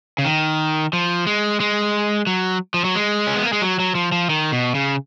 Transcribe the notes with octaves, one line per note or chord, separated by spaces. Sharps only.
C#3
D#3
F3
G#3
G#3
F#3
F3
F#3
G#3
C#4
B3
A#3
G#3
F#3
F#3
F3
F3
D#3
B2
C#3